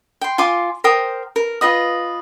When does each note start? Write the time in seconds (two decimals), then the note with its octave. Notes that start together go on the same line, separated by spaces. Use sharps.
0.21 G5 C6
0.38 F4 G#5 C6 D6
0.84 A#4 C5 G5 D#6
1.36 A#4
1.61 F4 B4 D#5 D#6